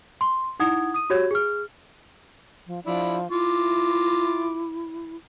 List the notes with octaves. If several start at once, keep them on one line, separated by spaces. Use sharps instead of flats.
C6
D#4 E4 F#5 D#6 G#6
D#6 D#7
F#4 G4 C#5 G#6
G#4 F6
F3
F3 D4 E4
E4 F4 D6